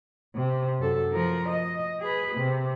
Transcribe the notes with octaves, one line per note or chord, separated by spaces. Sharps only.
C3
F#2 A4
F3 A#4
D#5
G#4 B4
C3